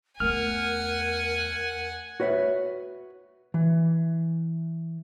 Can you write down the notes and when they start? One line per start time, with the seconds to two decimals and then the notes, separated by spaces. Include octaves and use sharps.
0.20 E2 A3 A#4 F#5 G#5 F6
2.20 F#4 B4 C#5 E5
3.54 E3